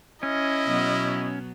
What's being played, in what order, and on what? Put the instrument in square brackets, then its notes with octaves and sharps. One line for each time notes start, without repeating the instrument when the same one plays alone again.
[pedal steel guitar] C#4 [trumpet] E4 [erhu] D#5
[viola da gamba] B2 F#3 B3